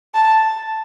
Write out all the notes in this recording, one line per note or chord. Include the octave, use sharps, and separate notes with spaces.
A5